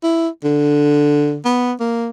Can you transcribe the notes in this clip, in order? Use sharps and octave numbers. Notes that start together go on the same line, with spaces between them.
E4
D3
B3
A#3